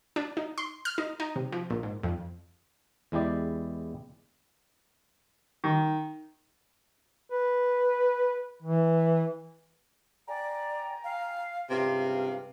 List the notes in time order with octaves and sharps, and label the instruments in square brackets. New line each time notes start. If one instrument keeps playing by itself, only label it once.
[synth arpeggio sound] D4
D#4
C6
F6
D#4
D#4
C3
F3
A#1
G#2
F2
[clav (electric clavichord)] E2 G#3 E4 G4 D5
[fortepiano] D#3
[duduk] B4
E3
[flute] D5 [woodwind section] G5 G#5 A#5
[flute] F5
[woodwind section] C#2 G2 [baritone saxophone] C3 [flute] F5